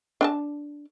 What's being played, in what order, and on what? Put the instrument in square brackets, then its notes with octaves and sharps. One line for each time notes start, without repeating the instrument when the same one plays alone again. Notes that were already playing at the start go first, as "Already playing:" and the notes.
[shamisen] D4 G#5 A5